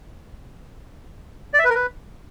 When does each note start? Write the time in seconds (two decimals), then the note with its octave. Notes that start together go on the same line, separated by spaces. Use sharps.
1.54 D5
1.59 E5
1.64 B4
1.70 A#4
1.75 B4